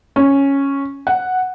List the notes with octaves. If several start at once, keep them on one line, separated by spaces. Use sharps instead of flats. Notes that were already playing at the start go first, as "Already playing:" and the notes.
C#4
F#5